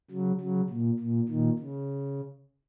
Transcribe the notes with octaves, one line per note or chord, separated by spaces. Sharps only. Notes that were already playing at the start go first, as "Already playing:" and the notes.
C#3 F#3
C#3 F#3
A#2
A#2
A#2 D#3
C#3